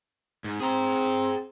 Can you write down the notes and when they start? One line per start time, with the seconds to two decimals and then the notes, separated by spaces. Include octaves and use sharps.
0.44 G#2
0.60 C4 G#4 A#5